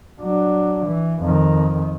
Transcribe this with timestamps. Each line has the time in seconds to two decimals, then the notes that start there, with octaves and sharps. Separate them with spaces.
0.21 F#3 D4
0.86 E3
1.21 F2 D#3